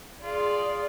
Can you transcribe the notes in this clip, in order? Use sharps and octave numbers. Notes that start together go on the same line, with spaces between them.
F4 G#4 D5